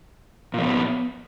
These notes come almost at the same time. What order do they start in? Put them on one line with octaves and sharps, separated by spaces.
A#2 F3 B3